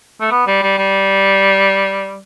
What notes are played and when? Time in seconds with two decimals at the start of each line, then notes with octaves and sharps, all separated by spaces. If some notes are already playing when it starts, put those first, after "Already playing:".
0.21 A3
0.31 B3
0.47 G3
0.63 G3
0.78 G3